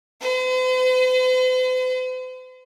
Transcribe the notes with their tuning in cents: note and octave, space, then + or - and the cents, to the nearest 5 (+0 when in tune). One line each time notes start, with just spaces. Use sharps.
C5 -45